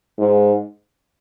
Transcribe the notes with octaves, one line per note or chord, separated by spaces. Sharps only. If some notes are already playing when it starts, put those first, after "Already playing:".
G#2